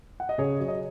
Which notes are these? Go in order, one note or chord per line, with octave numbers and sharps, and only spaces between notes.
F#5
D#5
C#3 G#4 C#5
F#3 C#5
D#5